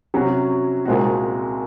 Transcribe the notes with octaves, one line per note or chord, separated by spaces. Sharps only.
C3 F#3 C#4 F#4
C2 A#2 G#3 C4 F#4